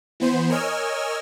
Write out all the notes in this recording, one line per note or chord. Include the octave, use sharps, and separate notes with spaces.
E3 B3 C5
A#4 C#5 D#5 G#5 E6 F6